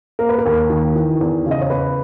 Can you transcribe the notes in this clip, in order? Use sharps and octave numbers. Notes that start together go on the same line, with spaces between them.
A#3 A#4
B4
A#4
D#2
D#3
E3
E2
C#3
D#5
C#5
B3 B4